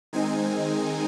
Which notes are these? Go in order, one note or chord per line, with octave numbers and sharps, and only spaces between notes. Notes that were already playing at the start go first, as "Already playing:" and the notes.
D#3 G#3 C4 D#4 G#5